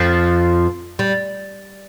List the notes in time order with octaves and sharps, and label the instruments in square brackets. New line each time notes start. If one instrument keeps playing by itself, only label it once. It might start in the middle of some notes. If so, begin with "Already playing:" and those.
Already playing: [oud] F2 F3
G3